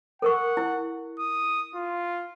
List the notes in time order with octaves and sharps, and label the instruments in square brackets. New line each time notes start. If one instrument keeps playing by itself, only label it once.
[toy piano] A4 A#4 C#6 [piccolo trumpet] F#5
[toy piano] E4
[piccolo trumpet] D#6
F4